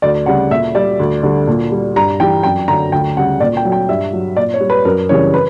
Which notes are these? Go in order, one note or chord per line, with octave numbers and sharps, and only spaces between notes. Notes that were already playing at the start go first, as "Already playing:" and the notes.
D2 D5
C#3 G3 F#5
A#2 E5
G3 D5
D2
D3 G3
A#2
G3
G2 A#5
E3 G3 G5
F#2 G5
D3 F#3 A#5
D2 G5
C#3 G3 F#5
A#2 D5
G5
F#3
G5
G2 E5
F#3
A#2 D5
C#5
G3
B4
F#2 A#4
C#3 E3 G3 C#5
B4